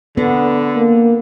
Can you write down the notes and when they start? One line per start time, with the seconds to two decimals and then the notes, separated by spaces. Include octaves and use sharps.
0.17 D3 B3
0.76 A#3